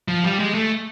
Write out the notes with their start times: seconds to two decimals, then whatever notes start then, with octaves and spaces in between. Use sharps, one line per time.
0.08 F3
0.24 G3
0.40 G#3
0.54 A3